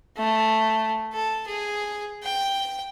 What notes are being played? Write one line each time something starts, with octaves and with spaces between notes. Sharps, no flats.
A3
A4
G#4
G5